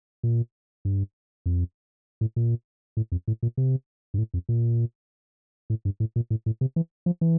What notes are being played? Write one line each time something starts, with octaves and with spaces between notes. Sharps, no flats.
A#2
G2
F2
A2
A#2
A2
F2
A2
A#2
C3
G2
A2
F2
A#2
A2
G2
A2
A#2
A2
A2
C3
E3
F3
E3